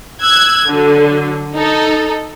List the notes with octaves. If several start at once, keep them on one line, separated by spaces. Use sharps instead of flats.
E6 F#6 G#6
D3 F#3
D#4 A4